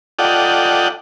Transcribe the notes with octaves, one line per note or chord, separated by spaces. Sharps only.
F4 A4 D5 D#5 F#5 G5